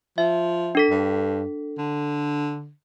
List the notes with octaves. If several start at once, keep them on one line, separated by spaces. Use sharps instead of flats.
F3 E5
D4 A4 B6
G2
D3